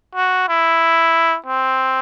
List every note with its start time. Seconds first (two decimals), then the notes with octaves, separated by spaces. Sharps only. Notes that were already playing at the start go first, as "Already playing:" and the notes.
0.15 F#4
0.49 E4
1.46 C4